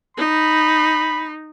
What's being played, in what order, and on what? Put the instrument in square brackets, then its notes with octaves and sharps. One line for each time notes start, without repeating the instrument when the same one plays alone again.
[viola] D#4 [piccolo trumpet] B5